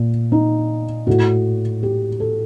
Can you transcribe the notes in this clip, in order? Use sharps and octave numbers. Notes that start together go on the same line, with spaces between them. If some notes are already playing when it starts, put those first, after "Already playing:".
Already playing: A#2
D#4
A2 F#4
G4
A4